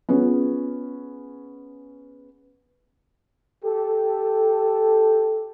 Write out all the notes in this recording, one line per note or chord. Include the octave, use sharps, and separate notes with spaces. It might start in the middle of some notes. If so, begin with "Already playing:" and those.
B3 C#4 F4 G#4
G4 A4